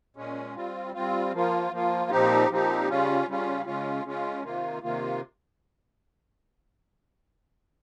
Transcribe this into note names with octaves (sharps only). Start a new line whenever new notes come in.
A#2 G#3 C#4
G3 C4 F4
G3 C4 F4
F3 A#3 F4
F3 A#3 F4
A#2 F3 C4 D#4 G4
A#2 F3 C4 D#4 G4
C#3 G3 C#4 F4
C#3 G3 C#4 F4
C#3 G#3 C#4 F4
C#3 G#3 C#4 F4
C3 D#3 A#3 F4
C3 D#3 A#3 F4